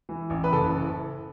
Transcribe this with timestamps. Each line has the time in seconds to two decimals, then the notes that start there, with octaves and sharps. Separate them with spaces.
0.09 E3
0.30 A1
0.44 B4
0.52 F#1 A4